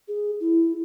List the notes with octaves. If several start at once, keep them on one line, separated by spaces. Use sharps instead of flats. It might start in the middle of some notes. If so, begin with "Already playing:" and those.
G#4
E4